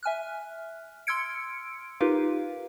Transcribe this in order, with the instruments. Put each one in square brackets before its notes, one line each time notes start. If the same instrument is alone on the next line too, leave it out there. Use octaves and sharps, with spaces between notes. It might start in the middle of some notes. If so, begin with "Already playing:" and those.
[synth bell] E5 G#5 F6 F#6
C6 E6 F6 G#6 C#7 D7
D#4 F4 G4 A#4 B4 F5